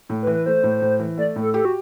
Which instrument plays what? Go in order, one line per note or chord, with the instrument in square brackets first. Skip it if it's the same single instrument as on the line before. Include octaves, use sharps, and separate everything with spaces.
[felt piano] A2
[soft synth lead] B4
[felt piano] E3
[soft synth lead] B4
[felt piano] A3 [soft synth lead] C5
[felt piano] A2
A2
E3
[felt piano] A3 [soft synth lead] D5
[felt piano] A2
[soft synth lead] A4
[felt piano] G4 [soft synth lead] A4
[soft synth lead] F#4